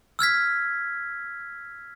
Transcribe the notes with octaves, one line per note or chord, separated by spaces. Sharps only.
E6 F6 G#6 B6